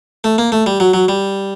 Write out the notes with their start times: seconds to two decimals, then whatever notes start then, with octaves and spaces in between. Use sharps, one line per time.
0.24 A3
0.38 A#3
0.52 A3
0.66 G3
0.80 F#3
0.94 F#3
1.08 G3